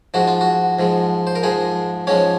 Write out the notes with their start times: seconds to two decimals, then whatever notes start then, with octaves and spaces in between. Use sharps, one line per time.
0.14 G#2 F3 G#3 F#4
0.27 F4
0.41 F#4
0.79 G#2 F3 G#3
1.27 C5
1.35 A#4
1.43 G#2 F3 G#3 G#4
2.07 G#2 F3 G#3 C#4 C#5